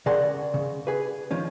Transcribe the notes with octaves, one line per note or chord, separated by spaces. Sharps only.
C#3 G#4 A#4 D5 F#5 C6
C#3
G#4 B4
D#3 F3 C#4